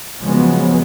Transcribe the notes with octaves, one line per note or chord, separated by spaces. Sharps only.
C#3 F3 F#3 G#3 B3